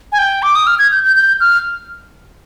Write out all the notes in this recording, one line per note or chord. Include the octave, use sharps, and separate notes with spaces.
G#5
G5
D6
D#6
F6
G#6
G6
G6
G6
F6